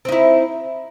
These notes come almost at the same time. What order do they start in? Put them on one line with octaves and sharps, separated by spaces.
C4 D#4 E4